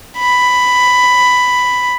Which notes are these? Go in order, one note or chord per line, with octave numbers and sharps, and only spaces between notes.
B5